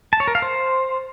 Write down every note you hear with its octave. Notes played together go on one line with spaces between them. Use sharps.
A5
C#5
A#4
F5
C5